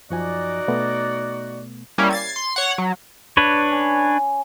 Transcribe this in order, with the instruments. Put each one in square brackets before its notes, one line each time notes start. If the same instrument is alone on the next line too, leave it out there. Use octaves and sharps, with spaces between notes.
[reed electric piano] F#2 F3 G#5 [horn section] D#4 F#4 D5
[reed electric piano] B2 A3 B3
[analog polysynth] G3 A#3 C#4 E4
G#6 A6 C7
C6
C#5 F#5
F#3
[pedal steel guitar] D4 B4 C#5
[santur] C#4